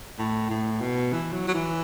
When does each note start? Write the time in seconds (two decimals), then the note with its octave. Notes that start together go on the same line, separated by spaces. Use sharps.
0.19 A2
0.50 A2
0.81 B2
1.12 E3
1.33 F#3
1.47 F#3
1.54 E3